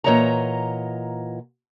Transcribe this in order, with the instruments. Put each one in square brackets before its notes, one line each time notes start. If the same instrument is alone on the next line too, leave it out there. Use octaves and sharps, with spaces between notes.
[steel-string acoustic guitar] A#2 E3 C#5 D#5 F#5 A#5